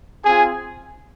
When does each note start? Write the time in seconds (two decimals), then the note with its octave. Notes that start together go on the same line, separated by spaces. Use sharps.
0.25 C4 F4 G#4 G#5